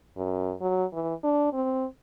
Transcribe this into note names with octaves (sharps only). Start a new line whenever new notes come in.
F#2
F#3
E3
D4
C4